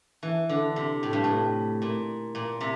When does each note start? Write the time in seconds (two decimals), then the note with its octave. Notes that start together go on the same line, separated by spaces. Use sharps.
0.23 E3
0.49 D3
0.76 C3
1.03 A2
1.13 G2
1.24 A2
1.82 A#2
2.35 A#2
2.61 C3